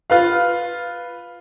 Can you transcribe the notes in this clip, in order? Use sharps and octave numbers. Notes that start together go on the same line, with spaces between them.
F4 B4 F5